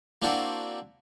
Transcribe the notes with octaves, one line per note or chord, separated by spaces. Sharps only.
A#3 C4 D4 E4 F#4